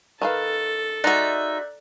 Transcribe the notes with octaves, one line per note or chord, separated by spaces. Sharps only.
D#3 A4 B4 F5
G#3 D#4 F#4 D5 E5 F#6